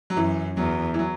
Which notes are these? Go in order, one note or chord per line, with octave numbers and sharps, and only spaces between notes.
F#3
F#2 E3
E2 F#3
E3
F#3